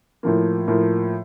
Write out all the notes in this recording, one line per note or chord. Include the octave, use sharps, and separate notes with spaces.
A2 F3 A#3
A2 F3 A#3